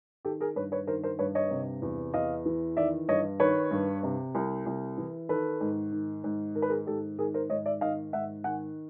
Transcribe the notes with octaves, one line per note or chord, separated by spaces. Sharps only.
D#3 G4 A4
G#4 A#4
G2 B4 C#5
B4 C#5
D#3 A#4 C5
A#4 C5
G2 B4 C#5
C#5 D#5
C3
E2
E2 D#5 F5
E3
D#3 D5 E5
G2 C#5 D#5
D#3 B4 C#5
G2
C3
C2
C2
E3
D#3 A4 B4
G#2
D#3
G#2
D#3 A#4
B4
G#4 A#4
G#2 G4 A4
D#3 G#4 A#4
A#4 C5
G#2 C#5 D#5
D5 E5
D#3 D#5 F5
G#2 E5 F#5
D#3 F#5 G#5